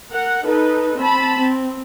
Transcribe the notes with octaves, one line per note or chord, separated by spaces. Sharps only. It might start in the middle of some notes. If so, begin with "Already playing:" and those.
A#4 F#5
D#4 A4 B4
C4 A5 B5
C4